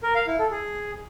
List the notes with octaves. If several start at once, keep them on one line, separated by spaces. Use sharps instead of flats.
A#4
F5
E4
A4
G#4